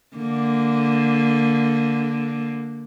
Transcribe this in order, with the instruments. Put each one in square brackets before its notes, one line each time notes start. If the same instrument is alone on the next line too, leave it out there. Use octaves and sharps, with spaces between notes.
[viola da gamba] D3 A#3